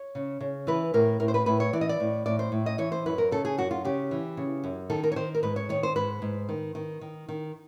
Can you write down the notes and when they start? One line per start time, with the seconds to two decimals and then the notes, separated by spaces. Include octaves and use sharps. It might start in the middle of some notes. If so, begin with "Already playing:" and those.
Already playing: C#5
0.15 C#3
0.41 C#3
0.67 E3 B4
0.94 A2 A#4
1.20 A2 A#4
1.28 C5
1.34 B4
1.46 A2 B4
1.60 C#5
1.73 E3 D5
1.81 D#5
1.89 D5
2.00 A2
2.26 A2 D5
2.39 C5
2.52 A2
2.66 D#5
2.78 E3 C#5
2.92 C5
3.06 F#2 B4
3.18 A#4
3.32 C#3 A4
3.45 G#4
3.58 F#2 F#4
3.71 F4
3.85 C#3 G4
4.11 E3
4.37 C#3
4.64 F#2
4.90 D#3 A4
5.04 A#4
5.12 C#5
5.16 D#3 C5
5.35 A#4
5.43 G#2 B4
5.56 C#5
5.69 D#3 C#5
5.83 C5
5.96 G#2 B4
6.22 G#2
6.49 D#3
6.75 D#3
7.01 D#3
7.29 D#3